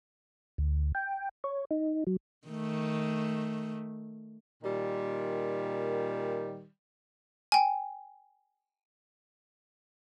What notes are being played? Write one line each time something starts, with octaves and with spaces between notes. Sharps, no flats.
D2
G5
C#5
D#4
F#3
D#3 A3
A#2 D#3 G3
G5 G#5